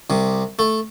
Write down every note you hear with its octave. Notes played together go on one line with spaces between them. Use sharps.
C2 C3
A3